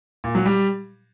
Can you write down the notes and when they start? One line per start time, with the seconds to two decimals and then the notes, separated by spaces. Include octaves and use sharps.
0.24 A#2
0.35 F#3
0.46 G3